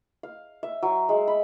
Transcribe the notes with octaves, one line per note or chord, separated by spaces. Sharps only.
F5
E5
F#3
G#3
B5